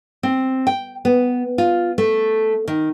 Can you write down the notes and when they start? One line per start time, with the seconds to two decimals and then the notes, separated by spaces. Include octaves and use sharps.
0.23 C4
0.67 G5
1.05 B3
1.58 F4
1.98 A3
2.68 D#3